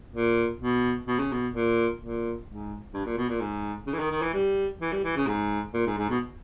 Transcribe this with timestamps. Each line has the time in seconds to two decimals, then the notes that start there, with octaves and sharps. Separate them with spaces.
0.14 A#2
0.60 B2
1.07 B2
1.19 C#3
1.32 B2
1.53 A#2
2.00 A#2
2.47 G#2
2.94 G2
3.05 A#2
3.17 B2
3.29 A#2
3.41 G#2
3.87 C#3
3.94 E3
3.99 D#3
4.11 D#3
4.22 E3
4.34 G3
4.81 E3
4.92 G3
5.04 E3
5.16 C#3
5.27 G#2
5.74 A#2
5.87 G#2
5.98 G#2
6.10 B2